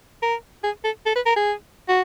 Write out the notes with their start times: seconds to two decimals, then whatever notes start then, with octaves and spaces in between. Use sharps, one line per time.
0.22 A#4
0.64 G#4
0.84 A4
1.06 A4
1.15 B4
1.26 A#4
1.36 G#4
1.88 F#4